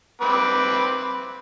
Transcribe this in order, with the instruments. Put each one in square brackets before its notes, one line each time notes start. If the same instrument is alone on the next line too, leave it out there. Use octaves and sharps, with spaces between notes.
[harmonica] C4 B4 D6